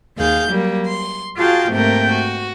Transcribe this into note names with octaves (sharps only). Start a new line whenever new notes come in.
D#2 G#4 F5 G6
F#3 G3 A#3
C6
F4 F#4 G#4 F5 G5 A5
G#2 C3 A3 A#3 A#4 G5
F#4